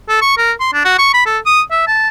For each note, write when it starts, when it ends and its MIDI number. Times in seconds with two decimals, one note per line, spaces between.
0.09 0.21 69
0.22 0.37 85
0.38 0.52 70
0.60 0.72 84
0.73 0.83 62
0.85 0.95 66
0.98 1.10 85
1.14 1.22 83
1.26 1.38 69
1.46 1.61 87
1.71 1.87 76
1.87 2.08 81